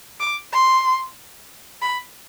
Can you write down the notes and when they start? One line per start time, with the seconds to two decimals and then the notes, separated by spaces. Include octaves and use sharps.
0.20 D6
0.53 C6
1.82 B5